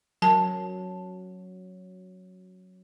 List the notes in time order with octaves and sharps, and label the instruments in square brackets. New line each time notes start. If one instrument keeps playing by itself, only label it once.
[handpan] F#3 [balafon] A#4 A5